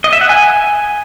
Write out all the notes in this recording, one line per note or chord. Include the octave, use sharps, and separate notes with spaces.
D#5
E5
F#5
G#5